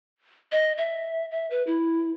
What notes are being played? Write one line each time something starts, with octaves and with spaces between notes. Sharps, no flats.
D#5
E5
E5
B4
E4